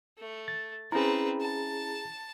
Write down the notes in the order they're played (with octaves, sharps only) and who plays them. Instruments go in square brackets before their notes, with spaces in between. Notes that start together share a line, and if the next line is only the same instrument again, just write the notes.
[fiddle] A3
[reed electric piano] A6
[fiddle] C4 B4 [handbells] C#4 E4 [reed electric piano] G#4 A#5
[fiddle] A5